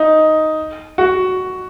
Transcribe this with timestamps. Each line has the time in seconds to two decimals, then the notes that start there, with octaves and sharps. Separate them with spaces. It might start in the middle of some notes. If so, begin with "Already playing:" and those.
Already playing: D#4
0.98 F#4